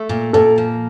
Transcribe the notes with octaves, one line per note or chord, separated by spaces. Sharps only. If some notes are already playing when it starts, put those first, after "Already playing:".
Already playing: A3
A#2
A#2 A4
F3